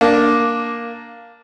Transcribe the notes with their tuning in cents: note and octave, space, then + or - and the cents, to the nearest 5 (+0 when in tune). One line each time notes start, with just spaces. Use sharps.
A#3 +0 D4 +0